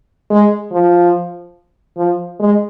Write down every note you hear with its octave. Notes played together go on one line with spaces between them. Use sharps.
G#3
F3
F3
G#3